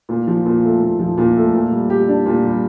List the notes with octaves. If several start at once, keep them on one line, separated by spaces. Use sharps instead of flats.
A#2
F3
A#2
A3
A#2
F3
A#2
A3
A#2
G3
G4
D4
A#2
G3